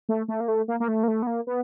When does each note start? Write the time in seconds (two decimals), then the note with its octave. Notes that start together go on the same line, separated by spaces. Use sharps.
0.09 A3
0.28 A3
0.40 A#3
0.48 A3
0.68 A#3
0.80 A#3
0.88 A3
1.03 A#3
1.08 A3
1.22 B3
1.27 A#3
1.47 B3